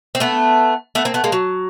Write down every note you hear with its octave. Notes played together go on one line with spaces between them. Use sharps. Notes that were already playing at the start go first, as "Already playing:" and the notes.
C4
A3 B3
A3 B3
A#3 C4
A3 B3
G#3 A#3
F#3